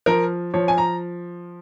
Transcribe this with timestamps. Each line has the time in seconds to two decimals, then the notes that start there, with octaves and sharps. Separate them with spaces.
0.06 F3 A#4
0.54 F3 C#5
0.68 G#5
0.78 A#5